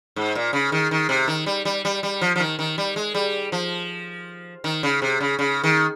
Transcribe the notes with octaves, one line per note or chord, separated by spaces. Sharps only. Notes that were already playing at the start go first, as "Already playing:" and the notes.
G#2
A#2
C#3
D#3
D#3
C3
D#3
G3
G3
G3
G3
F3
F3
D#3
D#3
G3
G#3
G3
F3
D#3
C#3
C3
C#3
C#3
D#3